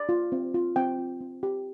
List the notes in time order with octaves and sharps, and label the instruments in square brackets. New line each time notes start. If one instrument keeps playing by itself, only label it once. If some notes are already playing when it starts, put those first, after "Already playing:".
Already playing: [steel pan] D5
F4
C4
F4
C4 G5
F4
C4
G4